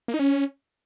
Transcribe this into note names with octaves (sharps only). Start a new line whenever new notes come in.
A#3
D#4
C#4